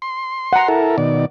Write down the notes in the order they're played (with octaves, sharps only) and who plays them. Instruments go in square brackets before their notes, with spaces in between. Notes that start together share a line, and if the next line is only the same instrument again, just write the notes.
[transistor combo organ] C6
[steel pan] F#5 A#5
[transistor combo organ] E4 A4 A#4
B2 D#3 D5